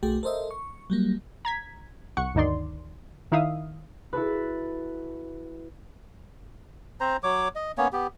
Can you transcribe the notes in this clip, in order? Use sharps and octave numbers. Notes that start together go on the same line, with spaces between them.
B1 A3 F#4 G#4 G5
A4 A#4 C5 D#5 E5
C#6
F#3 G3 A#3
A#5 G#6 B6
C2 F#5 C#6 C#7
D2 G2 D#3 D#4 D5 C6
D#3 D#4 E4 E5 F5 D#6
E4 F#4 A4 B4
C4 C5 A#5
F#3 C#5 D6
D#5
A#3 B3 C#4 C#5
B3 G4